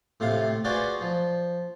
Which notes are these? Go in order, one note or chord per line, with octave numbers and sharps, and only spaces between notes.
A2 C3 F4 F5
F4 F#4 G#4 B4 C5 D5
F3